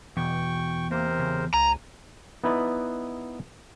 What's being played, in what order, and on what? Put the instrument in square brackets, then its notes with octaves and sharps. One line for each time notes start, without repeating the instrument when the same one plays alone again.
[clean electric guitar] E2 [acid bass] B2 [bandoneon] G5 C#6
[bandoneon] C3 A#4 C5 [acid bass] A#3
[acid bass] C#3
[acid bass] C#2 [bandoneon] G#5 [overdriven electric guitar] A#5
[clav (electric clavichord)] B3 D#4 E4 B4 D5